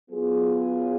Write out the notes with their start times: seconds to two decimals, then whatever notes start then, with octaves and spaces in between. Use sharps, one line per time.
0.11 F#3 B3 F4 G#4